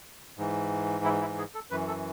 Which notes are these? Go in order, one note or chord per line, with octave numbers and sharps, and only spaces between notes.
G#2 E3
E4
E4
G#4
A4
F#2 E3 B4
A4